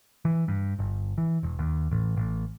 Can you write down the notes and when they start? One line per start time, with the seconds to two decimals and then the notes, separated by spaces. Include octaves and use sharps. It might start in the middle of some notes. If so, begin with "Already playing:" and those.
0.25 E3
0.48 G2
0.79 G1
1.18 E3
1.43 E1
1.59 D#2
1.91 A1
2.16 A1